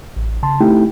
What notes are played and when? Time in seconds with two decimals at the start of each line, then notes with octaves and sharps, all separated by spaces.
0.16 A1
0.43 C#3 A5 C6
0.61 A3 C4 D#4 E4 G4 G5